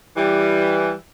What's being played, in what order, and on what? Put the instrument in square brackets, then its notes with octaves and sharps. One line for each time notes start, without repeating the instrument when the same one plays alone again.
[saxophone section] E3 G3